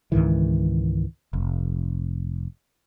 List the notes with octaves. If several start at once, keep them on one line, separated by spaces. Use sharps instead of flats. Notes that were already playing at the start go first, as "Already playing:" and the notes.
C#2 G#2 D#3 E3
F1